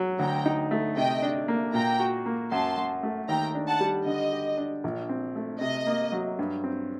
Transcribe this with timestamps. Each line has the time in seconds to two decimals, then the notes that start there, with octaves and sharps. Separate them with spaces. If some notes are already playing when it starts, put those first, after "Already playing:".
Already playing: F#3
0.19 D2 G5 A#5
0.46 D#4
0.71 A3
0.97 C3 D#5 G5
1.22 D4
1.48 A#3
1.74 A#2 G5 A#5
2.00 F#4
2.26 A#3
2.51 F#2 A5 C6
2.77 F#2
3.03 A3
3.28 D#2 G5 A#5
3.55 D4
3.67 F#5 A5
3.80 G3
4.06 D3 D#5
4.33 G4
4.57 D4
4.84 A#1
5.09 C4
5.36 A3
5.61 C3 D#5
5.86 A#3
6.12 F#3
6.39 G2
6.64 C4